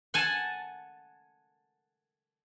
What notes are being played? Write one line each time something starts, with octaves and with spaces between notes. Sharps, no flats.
F#5 G#5 A5